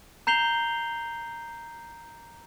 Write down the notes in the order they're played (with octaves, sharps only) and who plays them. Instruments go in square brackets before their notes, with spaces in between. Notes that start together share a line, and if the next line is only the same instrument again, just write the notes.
[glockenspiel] A#5 G6 C7 F7 G7